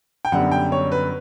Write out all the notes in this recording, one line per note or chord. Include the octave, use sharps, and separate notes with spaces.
G5
F#2 D3 G3 B3 F#5
G5
C#5
B4